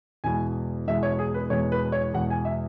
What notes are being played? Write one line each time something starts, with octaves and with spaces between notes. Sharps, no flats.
E2 B2 G#3 G#5
E2 B2 G#3 E5
C#5
G#4
B4
E2 B2 G#3 C#5
B4
C#5
E2 B2 G#3 F#5
G#5
E5